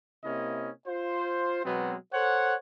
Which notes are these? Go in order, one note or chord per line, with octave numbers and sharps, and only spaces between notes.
C3 A#3 C#4 E4 D#5
F4 C5
B2 F#3 G#3 B3 C4
A4 C5 C#5 F#5